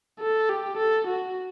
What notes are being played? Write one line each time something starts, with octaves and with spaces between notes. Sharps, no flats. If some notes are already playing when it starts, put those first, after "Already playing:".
A4
G4
A4
F#4